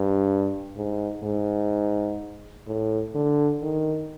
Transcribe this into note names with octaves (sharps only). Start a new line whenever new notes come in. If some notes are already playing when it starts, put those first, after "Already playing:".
Already playing: G2
G#2
G#2
A2
D3
D#3